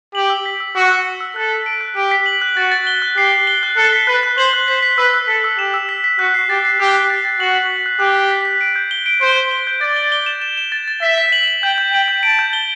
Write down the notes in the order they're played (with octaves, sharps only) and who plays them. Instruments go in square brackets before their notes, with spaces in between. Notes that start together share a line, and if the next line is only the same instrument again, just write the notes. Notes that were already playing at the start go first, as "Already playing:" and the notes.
[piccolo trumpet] G4 [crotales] F#7
[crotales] E6
B6
E6
[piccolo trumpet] F#4 [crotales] E6
[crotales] E6
E6
E6
[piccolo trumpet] A4 [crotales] F#6
[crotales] B6
D7
F#6
[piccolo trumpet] G4 [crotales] D7
[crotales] B6
F#7
F#6
[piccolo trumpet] F#4 [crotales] A6
[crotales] A6
G7
F#6
[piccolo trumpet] G4 [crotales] C7
[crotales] C7
G7
F#6
[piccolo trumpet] A4 [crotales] F#6
[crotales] B6
[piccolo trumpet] B4 [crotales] F#6
[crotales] F#6
[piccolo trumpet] C5 [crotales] F#7
[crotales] F#6
[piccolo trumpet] C5 [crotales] B6
[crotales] B6
[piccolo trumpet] B4 [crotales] E6
[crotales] E6
[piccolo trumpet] A4 [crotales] B6
[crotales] E6
[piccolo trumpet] G4 [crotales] E7
[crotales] E6
B6
B6
[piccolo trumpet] F#4 [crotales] F#6
[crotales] C7
[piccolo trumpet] G4 [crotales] A6
[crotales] C7
[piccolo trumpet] G4 [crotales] F#6
[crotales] F#6
A6
A6
[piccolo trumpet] F#4 [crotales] F#7
[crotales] B6
B6
F#6
[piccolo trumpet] G4 [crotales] F#6
[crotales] F#6
B6
B6
D7
G6
G7
D7
[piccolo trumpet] C5 [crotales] D7
[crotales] G6
G7
G6
[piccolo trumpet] D5 [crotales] A6
[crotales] G7
G7
E7
E7
E7
A6
A6
[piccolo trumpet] E5 [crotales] B6
[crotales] B6
F#7
F#7
[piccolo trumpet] G5 [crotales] G6
[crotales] G6
[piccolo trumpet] G5 [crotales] F#7
[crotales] G6
[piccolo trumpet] A5 [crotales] D7
[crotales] G6
G7